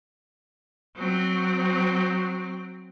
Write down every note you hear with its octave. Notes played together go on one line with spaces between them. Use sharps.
F#3 C4